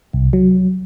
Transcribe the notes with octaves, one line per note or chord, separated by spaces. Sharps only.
C2
F#3